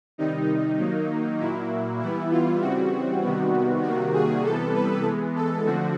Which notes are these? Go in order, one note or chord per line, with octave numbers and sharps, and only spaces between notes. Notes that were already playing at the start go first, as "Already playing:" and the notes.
C3 D#3 G3 D#4
D#3 F#3 A#3
A#2 F#3 A#3 E4
E3 G3 B3 E4
F4
C#3 E3 G3 C4 F#4
C3 D#3 G3 B3
C3 D#3 G3 A#3 F#4
G#4
C3 E3 G3 B3 A4
B4
E3 G#3 B3
A4
D3 F3 A3 C4 F#4